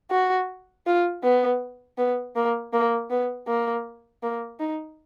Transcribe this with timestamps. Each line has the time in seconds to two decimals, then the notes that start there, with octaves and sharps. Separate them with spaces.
0.11 F#4
0.87 F4
1.23 B3
1.98 B3
2.36 A#3
2.73 A#3
3.10 B3
3.48 A#3
4.23 A#3
4.60 D#4